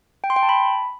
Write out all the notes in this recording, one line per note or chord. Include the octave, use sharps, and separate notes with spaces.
G5
C6
G5
A5
B5